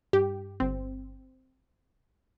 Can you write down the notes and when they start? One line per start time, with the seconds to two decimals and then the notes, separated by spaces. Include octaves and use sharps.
0.13 G2 G4
0.60 G1 C4